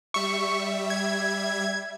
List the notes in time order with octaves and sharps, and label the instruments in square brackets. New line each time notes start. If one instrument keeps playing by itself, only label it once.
[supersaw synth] G3 E5 [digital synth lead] C#6
[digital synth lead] G#6